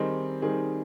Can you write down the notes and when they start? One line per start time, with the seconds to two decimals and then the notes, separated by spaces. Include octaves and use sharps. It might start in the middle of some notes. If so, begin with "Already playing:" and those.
Already playing: D#3 G3 C4 D#4 G#4
0.42 D#3 G3 C4 D#4 G#4